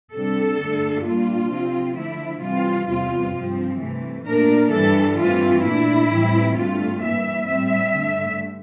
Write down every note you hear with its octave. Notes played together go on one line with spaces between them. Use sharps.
C3 G3 D4 A4
G2 D3 A3 D4
A#2 G3 A#3 D4 F4
C3 F3 C4
D3 F3 A3 E4
C3 E3 G3 C4 F4
E2 C3 G3 C4 F4
G2 F3 C4
C3 E3 A3
A#2 A3 D4 A#4
G2 E3 G3 D4 A4
G2 E3 A3 C4 F4
A#2 A3 D4 E4
A2 E3 G3 C4
G2 D3 A3 F4
G2 E3 A#3 E5
A2 G3 C4 E5
G2 D3 A3